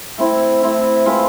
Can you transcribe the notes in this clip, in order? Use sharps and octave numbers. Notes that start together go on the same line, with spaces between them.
A3 C4 E4
A3 C4 E4
G#3 C4 F4 B4